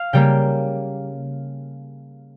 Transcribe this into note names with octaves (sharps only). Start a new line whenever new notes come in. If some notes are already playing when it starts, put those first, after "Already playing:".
Already playing: F5
C#3 G3 A#3 G5